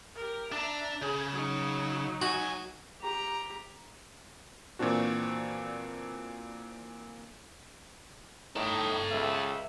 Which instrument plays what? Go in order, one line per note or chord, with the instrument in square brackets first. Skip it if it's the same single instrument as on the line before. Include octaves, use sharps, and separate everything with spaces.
[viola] G4 A#4
[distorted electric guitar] D4 [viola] E5 A#5
[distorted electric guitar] C#3 [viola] G#4 G#5
[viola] F#3 D#4
[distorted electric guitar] C#2 G#5 [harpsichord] F#4
[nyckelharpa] G4 A#5
[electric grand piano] A#2 E3 C4 D4 F#4
[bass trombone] A2 [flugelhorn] D#4 [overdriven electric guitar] A4 G5
[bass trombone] C#2 [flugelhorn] E5